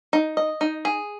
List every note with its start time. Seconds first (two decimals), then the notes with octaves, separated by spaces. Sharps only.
0.13 D#4
0.37 D#5
0.61 D#4
0.85 G#4